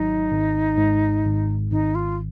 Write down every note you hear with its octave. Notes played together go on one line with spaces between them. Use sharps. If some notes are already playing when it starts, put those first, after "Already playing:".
Already playing: G#1 F#3 D#4
G#1
G#2
G#1
G#1 D#4
F4